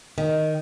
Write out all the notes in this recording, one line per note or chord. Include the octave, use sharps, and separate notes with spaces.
D#3